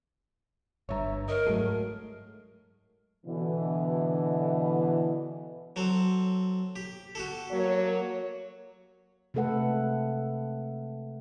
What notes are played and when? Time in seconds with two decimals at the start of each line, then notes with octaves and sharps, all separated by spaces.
0.89 G1 G2 C#5 E5 A#5
1.28 A#4 C#5 D#5
1.47 G#2 F#3 G#3 A3
3.25 B2 D3 E3
5.76 F#3 C4 A4
6.76 G4
7.15 F#4 G4 A4
7.51 F#3 A#3 C#5
9.34 C3 G#3 A3 A4 B4 F#5